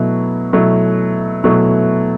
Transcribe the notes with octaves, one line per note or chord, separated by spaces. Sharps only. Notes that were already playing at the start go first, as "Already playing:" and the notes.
Already playing: B2 F#3 A3 E4
B2 F#3 A3 E4
B2 F#3 A3 E4